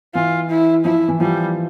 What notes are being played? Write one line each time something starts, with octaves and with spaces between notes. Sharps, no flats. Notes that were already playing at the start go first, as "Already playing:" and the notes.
E3 F4
E4
F3 E4
E3
F3 G3